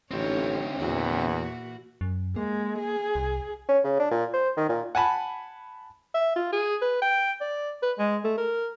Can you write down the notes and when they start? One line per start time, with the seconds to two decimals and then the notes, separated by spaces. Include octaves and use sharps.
0.11 A1 D2 C4 D#4 F4 C#5
0.80 E2 A#2 E3 F#4
2.01 F#2
2.36 G#3 A#3
2.79 G#4
3.15 C2
3.69 C#4
3.84 C#3
4.00 D4
4.11 A#2
4.33 C5
4.57 D#3
4.69 A#2
4.95 F#5 G#5 A5 B5
6.14 E5
6.36 F4
6.52 G#4
6.81 B4
7.02 G5
7.40 D5
7.82 B4
7.98 G#3
8.24 A3
8.37 A#4